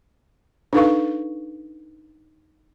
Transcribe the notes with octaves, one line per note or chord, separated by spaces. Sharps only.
D4 D#4 A4 B4 F5 C#6